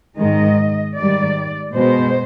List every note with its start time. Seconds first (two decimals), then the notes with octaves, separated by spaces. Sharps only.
0.18 G#2 D#3 G#3 D#5
0.97 G#2 D#3 G3 D5
1.75 B2 G#3 C5